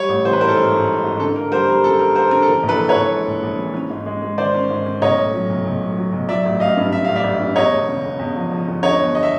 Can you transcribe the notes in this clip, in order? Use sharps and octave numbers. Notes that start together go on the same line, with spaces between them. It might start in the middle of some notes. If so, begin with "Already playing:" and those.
Already playing: G3 C#5
A1
E3 C5
B4
G#2 A#4 C5
A4
G#2 A#4
G#2
G#2
G#2
D3 A4
A#3 A#4
G3 A#4 C5
G3 A#4
F#2 A4
A#3 A#4
A#3 A#4 C5
D3 A#4
A4
E3 A#4
A#1
A4 B4
E3
B4 C#5
A#1
G#3
A#1
A#1
E3
C#4
G#2
G#3
G#3
D#3 C5 D5
C#4
G#2
C#4
B1 C#5 D#5
A2
F#3
B1
B1
F#3
F#3
B1
F#3 D5 E5
A1
A1 D#5 F5
G2
G2 E5
A1 F5
D5 E5
A1
G2
E2 C#5 D#5
E1
C#3
E2
E2
F3
F3
E2
D3 C#5 D#5
G1
D#5
E5